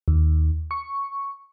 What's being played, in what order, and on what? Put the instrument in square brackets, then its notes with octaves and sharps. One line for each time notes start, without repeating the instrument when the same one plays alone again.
[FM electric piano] D#2
C#6